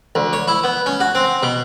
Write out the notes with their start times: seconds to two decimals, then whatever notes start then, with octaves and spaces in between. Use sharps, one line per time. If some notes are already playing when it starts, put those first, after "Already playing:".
0.15 D2
0.33 C#5
0.48 E4
0.64 B3
0.86 C#4
1.00 F#4
1.15 C4
1.43 B2